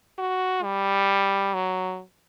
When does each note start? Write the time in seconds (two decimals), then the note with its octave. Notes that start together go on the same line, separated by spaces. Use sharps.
0.18 F#4
0.63 G3
1.54 F#3